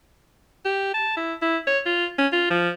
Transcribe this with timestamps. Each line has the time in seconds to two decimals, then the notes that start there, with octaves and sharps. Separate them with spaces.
0.65 G4
0.94 A5
1.17 E4
1.42 E4
1.67 C#5
1.86 F4
2.18 C#4
2.32 F4
2.50 F3